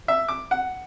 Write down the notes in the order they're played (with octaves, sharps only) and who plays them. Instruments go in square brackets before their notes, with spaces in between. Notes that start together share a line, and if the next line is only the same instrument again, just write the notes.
[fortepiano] E5
D6
F#5